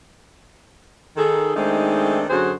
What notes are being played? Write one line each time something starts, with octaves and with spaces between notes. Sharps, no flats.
D#3 G#4 A4
D#3 G#3 A3 C4 D4 D#4
F#2 D3 F#3 F#4 G#4 C5